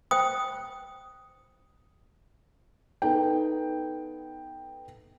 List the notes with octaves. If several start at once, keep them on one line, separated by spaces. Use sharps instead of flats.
C5 G5 D#6
B3 D#4 A4 G5